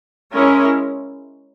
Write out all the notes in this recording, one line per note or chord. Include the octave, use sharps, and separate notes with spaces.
G#3 C#4 E4 A#4 C#5